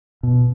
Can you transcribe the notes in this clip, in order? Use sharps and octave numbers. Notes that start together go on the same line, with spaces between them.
B2